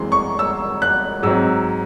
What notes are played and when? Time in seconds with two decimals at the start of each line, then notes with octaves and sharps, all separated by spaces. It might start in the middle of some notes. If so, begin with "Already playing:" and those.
Already playing: F#2 E3 G#3 C4 C6
0.12 C#6
0.39 E6
0.82 F#6
1.23 G#2 F#3 C4 E6